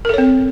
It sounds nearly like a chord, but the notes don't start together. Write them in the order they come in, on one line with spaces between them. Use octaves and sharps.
A#4 A4 C#5 C4